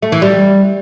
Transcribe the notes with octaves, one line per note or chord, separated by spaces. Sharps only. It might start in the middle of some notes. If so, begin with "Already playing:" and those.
A3
E3
G3